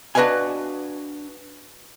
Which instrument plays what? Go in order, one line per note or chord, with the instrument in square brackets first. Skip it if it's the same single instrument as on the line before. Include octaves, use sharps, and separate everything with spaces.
[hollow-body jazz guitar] D4 F#4 B4 D#5 F5 G#5